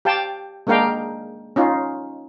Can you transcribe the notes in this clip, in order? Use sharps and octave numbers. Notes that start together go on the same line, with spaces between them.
G4 F5 G5 A5
G#3 A#3 D4 A#4 F5 G5
C#4 D#4 F4